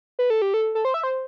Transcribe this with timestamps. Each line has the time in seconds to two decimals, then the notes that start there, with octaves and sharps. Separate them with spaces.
0.19 B4
0.30 A4
0.42 G4
0.54 A4
0.75 A4
0.85 C5
0.94 E5
1.03 C5